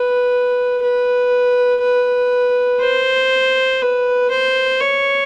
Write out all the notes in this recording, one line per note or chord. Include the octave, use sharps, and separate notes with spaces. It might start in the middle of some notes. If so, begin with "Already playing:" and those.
Already playing: B4
B4
B4
C5
B4
C5
C#5